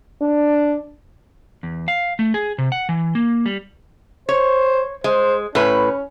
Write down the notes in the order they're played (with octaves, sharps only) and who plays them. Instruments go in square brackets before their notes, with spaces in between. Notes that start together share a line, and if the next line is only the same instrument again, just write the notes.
[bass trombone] D4
[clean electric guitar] E2
F5
A3
G#4
C3
F#5
E3
A#3
G3
[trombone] C5 [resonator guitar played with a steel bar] C#5
[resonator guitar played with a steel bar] G#3 [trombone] C5
[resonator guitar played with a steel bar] A2 B4 [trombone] C#4